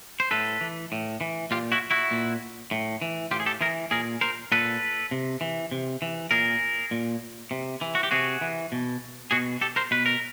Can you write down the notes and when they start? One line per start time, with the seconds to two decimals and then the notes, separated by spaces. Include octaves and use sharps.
0.20 C5
0.31 A2 A4 B4
0.61 E3
0.92 A2
1.21 E3
1.51 A#2 F4 G4
1.72 E4 F#4
1.91 E4 F#4
2.11 A#2
2.71 A2
3.02 E3
3.31 A2 F4 G4
3.40 G#4
3.46 G4 A4
3.61 E3 G#4 A#4
3.91 A#2 G#4 A#4
4.21 A#4 C5
4.52 A#2 A4 B4
5.11 C3
5.41 E3
5.72 C3
6.02 E3
6.31 A#2 G#4 A#4
6.91 A#2
7.51 C3
7.81 E3
7.95 F#4
8.03 G4
8.11 C3 F#4 G#4
8.41 E3
8.72 B2
9.31 B2 F#4 G#4
9.61 G4 A4
9.76 A#4 C5
9.91 B2 B4
10.06 A#4